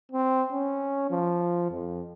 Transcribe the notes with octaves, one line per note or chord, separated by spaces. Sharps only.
C4
C#4
F3
F2